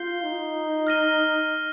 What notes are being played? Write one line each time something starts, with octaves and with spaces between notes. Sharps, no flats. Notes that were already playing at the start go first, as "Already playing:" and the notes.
Already playing: F4 G6 C7 G7
D#4
F6 A#6 D#7 G7